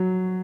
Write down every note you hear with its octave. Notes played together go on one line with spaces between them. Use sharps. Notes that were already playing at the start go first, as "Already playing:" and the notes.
Already playing: F#3